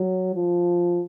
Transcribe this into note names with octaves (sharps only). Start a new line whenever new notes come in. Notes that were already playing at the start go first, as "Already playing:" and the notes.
Already playing: F#3
F3